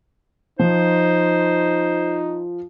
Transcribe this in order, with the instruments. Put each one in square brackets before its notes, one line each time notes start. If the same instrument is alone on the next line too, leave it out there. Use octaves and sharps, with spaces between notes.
[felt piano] F3 [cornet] D#4 [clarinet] C5